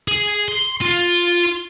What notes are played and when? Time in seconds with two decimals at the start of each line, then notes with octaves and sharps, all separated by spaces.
0.08 G#4
0.48 C6
0.81 F4